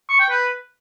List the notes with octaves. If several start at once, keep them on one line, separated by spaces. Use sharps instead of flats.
C#6
G5
B4